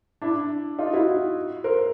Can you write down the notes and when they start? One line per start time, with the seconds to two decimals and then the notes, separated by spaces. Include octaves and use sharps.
0.22 D4 E4
0.79 D#4 F4
0.93 E4 F#4
1.64 A#4 C5